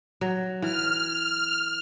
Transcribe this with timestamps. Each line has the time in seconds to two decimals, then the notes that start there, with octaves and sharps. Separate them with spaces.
0.21 F#3
0.62 E3 F6